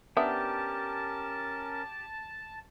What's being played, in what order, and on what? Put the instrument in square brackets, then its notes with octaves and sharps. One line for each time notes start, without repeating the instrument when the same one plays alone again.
[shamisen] B3 D4 E5 [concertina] C#4 A#4 [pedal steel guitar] G4 [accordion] A5